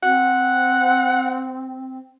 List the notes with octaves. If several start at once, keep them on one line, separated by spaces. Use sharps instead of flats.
C4 F#5